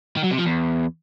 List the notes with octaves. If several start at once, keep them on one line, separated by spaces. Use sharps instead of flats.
D#3
F#3
C3
F3
E2